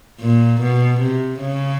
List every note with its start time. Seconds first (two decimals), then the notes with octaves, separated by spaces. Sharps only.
0.20 A#2
0.61 B2
1.01 C3
1.41 C#3